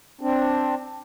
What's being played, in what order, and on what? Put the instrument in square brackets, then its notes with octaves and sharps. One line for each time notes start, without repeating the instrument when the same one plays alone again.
[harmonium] C4 D4